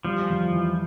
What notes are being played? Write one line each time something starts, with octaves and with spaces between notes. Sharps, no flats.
F3 G3
F2
E3